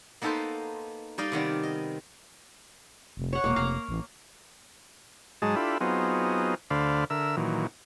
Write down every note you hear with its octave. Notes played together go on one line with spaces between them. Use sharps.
A#3 B3 D#4 A4 B4 C5
G3 D#4 D5 D#5 F5
C3 D#3 B3 D5
D#5
F1
C#5 F#5
E1 A#3
F1 F5 A#5
A1
G#2 F#3 G#3 D#4 G#4 A5
D4 E4 F4 G4 A4 B5
F#3 B3 C4 D#4 F4 G#4
D2 D3 C5 D5 F5 B5
D3 A#4 E5 E6
A#2 D#3 E3 F#3